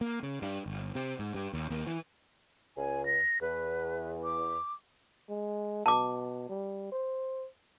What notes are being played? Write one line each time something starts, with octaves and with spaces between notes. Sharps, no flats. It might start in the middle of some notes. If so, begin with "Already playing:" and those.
A#3
C#3
G2
G1
C3
G#2
G2
D#2
D#2
E3
C#2 G#5
A#6
E2 B4
D6
G#3
B2 A5 D6
G3
C5